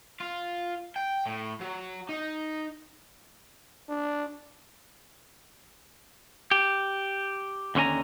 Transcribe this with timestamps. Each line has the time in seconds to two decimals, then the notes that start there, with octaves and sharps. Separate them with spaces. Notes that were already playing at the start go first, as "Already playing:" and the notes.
0.21 F4
0.96 G5
1.26 A2
1.61 F#3
2.09 D#4
3.89 D4
6.51 G4
7.75 D#2 D3 C#4 G#5 A#5